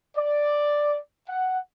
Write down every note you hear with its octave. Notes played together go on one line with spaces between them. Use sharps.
D5
F#5